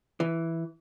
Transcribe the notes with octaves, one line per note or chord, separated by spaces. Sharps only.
E3